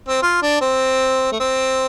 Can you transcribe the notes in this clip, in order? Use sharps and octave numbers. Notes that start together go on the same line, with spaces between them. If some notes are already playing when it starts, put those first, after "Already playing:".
C4
F4
D4
C4
A3
C4